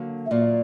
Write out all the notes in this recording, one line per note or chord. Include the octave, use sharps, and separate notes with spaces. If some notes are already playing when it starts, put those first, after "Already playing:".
Already playing: D3 F#3 A#3
E5
A#2 F#3 A#3 D5